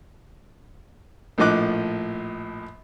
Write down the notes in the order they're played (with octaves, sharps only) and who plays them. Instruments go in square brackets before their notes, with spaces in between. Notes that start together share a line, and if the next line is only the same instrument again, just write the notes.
[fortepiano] A#1 A2 F3 D#5 D6 F#6